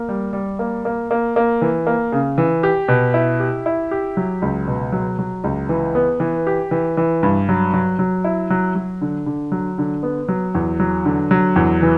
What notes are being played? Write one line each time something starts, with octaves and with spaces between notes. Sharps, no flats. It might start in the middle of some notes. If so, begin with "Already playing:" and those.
Already playing: A#3
G3
G3
A#3
A#3
A#3
A#3
E3
A#3
C#3
E3
G4
B2
E4
G4
E4
G4
F#3
C#2
B2
F#3
F#3
C#2
E3
B3
E3
G4
E3
E3
G2
F#3
F#3
F#3
E4
F#3
F#3
D3
D3
F#3
D3
B3
F#3
E2
F#3
D3
F#3
E2
E3